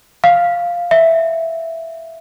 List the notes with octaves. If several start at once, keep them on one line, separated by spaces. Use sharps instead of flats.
F5
E5